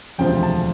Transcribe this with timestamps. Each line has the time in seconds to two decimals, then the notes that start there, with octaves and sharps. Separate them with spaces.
0.18 E1 D2 C3 F3 G5
0.43 A5